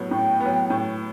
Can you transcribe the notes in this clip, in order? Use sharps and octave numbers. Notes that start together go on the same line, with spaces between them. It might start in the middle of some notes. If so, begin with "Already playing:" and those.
Already playing: A2 F#3 B3
A2 G5
B3
F#3
A2